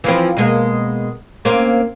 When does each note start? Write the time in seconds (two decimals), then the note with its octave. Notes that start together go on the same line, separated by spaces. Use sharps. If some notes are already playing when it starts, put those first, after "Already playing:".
0.04 E3 F3 C4
0.37 B2 G#3 A#3
1.45 A#3 C4 C#4